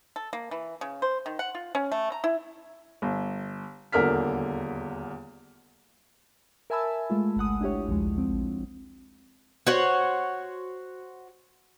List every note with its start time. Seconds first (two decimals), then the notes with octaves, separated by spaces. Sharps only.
0.16 A4
0.33 A#3
0.51 E3
0.81 C#3
1.02 C5
1.26 D#3
1.39 F#5
1.55 F4
1.75 C#4
1.92 A3
2.12 A#5
2.24 E4
3.02 G1
3.92 D#1 E2 D3 A#4 F6 B6
6.70 A#4 E5 G#5 A5 B5 E6
7.10 G#3 A3 F4
7.36 G#1 C#2 F#5 D#6
7.61 D4 E4 G4 C#5
7.88 A#1 D#2 F3 G#3
8.15 A1 F3 C4
9.67 F#4 C5 C#5 F#5